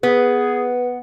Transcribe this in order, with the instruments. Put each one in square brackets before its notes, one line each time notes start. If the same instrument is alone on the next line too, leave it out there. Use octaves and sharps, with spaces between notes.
[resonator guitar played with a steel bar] B3 [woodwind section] G#4 [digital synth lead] B4